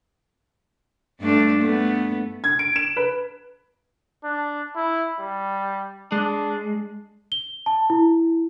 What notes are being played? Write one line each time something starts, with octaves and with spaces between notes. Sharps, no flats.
G2 A3 D4
A3 B3
G#6
D7
E7
B4
D4
E4
G3
G#3 D4
G7
A5
E4